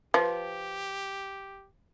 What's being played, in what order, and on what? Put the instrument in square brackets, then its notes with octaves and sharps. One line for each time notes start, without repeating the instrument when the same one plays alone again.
[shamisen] F3 [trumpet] G4 [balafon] B4